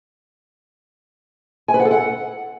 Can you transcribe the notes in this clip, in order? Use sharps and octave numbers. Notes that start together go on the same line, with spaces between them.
G#5
B4
F#5
A4
F#5